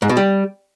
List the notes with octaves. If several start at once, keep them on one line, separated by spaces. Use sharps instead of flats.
G#2
B2
G3